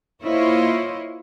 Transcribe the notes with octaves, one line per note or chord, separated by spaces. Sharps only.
A#3 E4 F4 C5 C#5 D#5